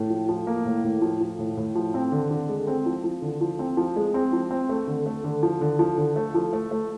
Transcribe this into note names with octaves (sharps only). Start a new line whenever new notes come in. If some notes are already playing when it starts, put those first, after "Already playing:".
Already playing: A2
F3
F3
A#3
A2
A2
F3
F3
A2
A2
F3
C4
D3
D3
G#3
C4
F3
F3
D3
F3
C4
F3
G#3
C4
F3
C4
A3
D3
A3
D3
F3
D3
F3
D3
A3
F3
A3
A3